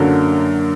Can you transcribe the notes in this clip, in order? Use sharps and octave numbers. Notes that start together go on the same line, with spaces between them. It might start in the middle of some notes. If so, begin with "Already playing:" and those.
Already playing: F#2 D3 F#3 A#3